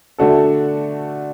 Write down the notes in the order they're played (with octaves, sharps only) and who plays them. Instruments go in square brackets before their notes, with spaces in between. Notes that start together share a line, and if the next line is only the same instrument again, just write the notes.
[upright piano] D3 A3 D4 F#4 A4